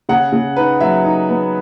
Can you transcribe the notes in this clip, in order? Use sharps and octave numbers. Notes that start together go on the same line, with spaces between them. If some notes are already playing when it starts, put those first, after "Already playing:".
C#3 F#5
C#3
D#4 B4
F#3 E5
D#4
B3